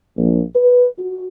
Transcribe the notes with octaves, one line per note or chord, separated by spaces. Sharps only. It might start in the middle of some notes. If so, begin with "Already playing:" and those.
A#1
B4
F#4